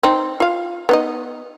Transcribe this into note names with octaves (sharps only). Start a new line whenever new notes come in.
C4 D#4
F4 F5
B3 D#4 D#5